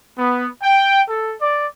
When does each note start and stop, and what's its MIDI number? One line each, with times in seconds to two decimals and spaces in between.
0.19 0.47 59
0.63 1.02 79
1.09 1.35 69
1.42 1.67 74